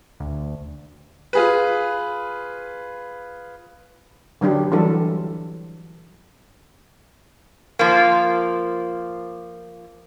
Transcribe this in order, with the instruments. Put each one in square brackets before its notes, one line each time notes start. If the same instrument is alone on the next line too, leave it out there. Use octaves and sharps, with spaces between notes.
[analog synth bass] D2
[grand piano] F4 G#4 B4
[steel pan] D3 F#3 D4 G4
E3 F#3 G3 D4 A4
[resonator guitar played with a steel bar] F3 A#3